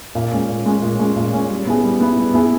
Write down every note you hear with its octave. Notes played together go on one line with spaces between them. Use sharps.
A#2
G#3 C#4
A#2
G#3 C#4
A#2
G#3 C#4
A#2
G#3 C#4
G3
B3 E4 G#4
G3
B3 E4 G#4
G3
B3 E4 G#4